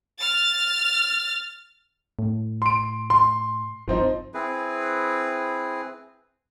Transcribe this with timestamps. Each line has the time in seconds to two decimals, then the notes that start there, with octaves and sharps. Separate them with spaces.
0.19 F6 A6
2.19 A2
2.62 C6 D7
3.10 C6
3.88 G1 F3 C4 D#4
4.34 C4 E4 G#4 B4